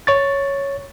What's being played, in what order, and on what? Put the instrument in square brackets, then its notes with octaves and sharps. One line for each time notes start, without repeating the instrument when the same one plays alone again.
[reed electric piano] C#5 C#6 A6